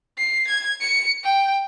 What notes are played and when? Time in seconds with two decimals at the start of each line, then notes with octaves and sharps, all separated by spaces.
0.18 C7
0.48 G#6
0.81 C#7
1.24 G5